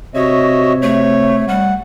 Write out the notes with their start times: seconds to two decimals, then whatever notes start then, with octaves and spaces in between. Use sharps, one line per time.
0.15 C3 F#4 C#5 D#5 E5
0.82 A3 C#5
1.48 G3 F#5